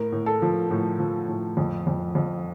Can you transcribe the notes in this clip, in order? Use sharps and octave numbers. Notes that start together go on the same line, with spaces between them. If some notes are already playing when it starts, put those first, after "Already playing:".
Already playing: A2 A#4
A2
A4
F3
A2
F3
A2
F2
F2
F2